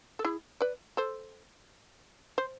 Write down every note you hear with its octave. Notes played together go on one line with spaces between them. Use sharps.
A4
E4 G#4
B4 D5
A4 C5
C5